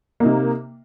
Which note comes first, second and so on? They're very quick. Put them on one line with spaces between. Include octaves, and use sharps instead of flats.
A#3 D#4 C3